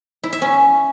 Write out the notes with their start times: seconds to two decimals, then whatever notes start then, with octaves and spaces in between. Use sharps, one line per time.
0.23 E4
0.33 E5
0.42 C#4